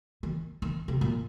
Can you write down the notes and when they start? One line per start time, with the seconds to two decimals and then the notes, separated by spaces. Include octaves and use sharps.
0.23 D#3
0.62 D#3
0.88 C3
1.01 A#2